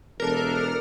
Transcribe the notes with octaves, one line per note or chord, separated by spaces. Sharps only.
E1 D4 A4 A#4